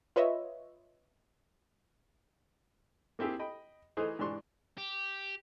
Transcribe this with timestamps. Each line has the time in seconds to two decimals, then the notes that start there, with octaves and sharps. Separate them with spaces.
0.16 F4 B4 C#5 D#5 E5
3.19 A#3 C4 E4 G4 G#4
3.39 D#5 G5 B5
3.97 E3 A3 D#4 G#4 C5
4.19 G#2 E3 D4 C6 C#6
4.78 G4